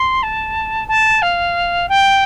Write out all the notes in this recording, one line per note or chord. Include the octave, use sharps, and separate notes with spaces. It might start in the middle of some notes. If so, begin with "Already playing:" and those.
Already playing: C6
A5
A5
F5
G5